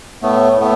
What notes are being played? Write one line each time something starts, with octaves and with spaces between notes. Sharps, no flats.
A2 A3 B3
A2 A3 B3